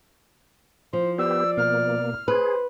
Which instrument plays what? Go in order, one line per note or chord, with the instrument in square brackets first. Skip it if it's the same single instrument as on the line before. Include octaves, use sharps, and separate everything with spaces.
[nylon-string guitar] F3 [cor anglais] C5
[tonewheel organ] B3 G4 [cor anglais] D5 [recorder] E6
[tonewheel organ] B2 A#3 [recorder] F6
[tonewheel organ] G#4 [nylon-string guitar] B4 [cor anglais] C5